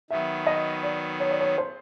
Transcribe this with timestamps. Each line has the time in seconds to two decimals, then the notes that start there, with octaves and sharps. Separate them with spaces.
0.10 D#3 F#3 B3 E5
0.47 D#5
0.83 D5
1.20 C#5
1.31 D5
1.41 C#5
1.58 C5